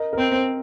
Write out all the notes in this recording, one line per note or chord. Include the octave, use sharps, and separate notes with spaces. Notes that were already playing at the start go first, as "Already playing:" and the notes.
Already playing: A#4 D#5
A#4
C4 C5
C5